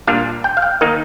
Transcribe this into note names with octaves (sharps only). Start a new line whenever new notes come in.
A#2 G3 D4 F5
G5
F5
G5
D#3 A#3 D#4